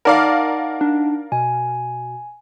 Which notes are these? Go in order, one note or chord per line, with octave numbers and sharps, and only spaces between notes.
D#4 A#4 D5 F5 F#5 A5
D4
B2 G#5